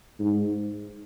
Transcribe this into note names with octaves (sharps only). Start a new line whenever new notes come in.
G#2